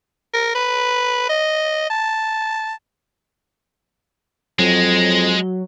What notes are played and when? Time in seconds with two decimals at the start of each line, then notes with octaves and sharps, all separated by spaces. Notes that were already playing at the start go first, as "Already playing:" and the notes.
0.34 A#4
0.55 B4
1.29 D#5
1.90 A5
4.59 F2 F#3 G#3